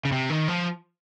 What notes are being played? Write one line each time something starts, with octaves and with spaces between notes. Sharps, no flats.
C#3
C3
D#3
F3